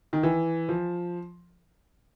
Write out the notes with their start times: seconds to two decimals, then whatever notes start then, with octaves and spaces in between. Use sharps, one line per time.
0.13 D#3
0.23 E3
0.69 F3